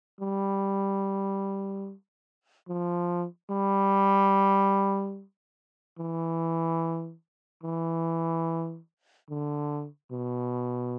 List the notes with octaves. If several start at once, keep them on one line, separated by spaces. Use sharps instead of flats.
G3
F3
G3
E3
E3
D3
B2